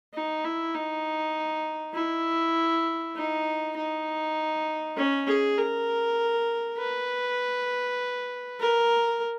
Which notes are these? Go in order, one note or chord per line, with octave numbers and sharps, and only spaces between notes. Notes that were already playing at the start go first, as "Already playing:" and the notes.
D#4
E4
D#4
E4
D#4
D#4
C#4
G#4
A#4
B4
A#4